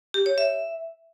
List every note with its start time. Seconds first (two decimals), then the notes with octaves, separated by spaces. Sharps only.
0.14 G4
0.26 C#5
0.38 E5